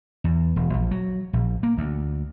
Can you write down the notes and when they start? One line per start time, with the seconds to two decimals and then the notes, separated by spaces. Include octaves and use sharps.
0.24 E2
0.56 E1
0.74 A#1
0.91 F#3
1.33 A#1
1.63 A#3
1.78 D2